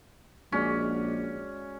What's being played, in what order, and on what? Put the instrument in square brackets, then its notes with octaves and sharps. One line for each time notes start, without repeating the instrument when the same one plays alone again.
[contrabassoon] A#1 [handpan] G#3 F#4 D5 [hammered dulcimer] C#4